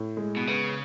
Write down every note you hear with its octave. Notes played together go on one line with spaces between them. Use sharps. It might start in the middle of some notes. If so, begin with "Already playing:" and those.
Already playing: A2
G#3
B2
C#3 B3